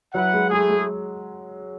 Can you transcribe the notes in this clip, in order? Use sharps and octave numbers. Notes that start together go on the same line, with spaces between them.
F#3 E4 B4 F#5
G#3
G#3 A3 E4 G#4
G#3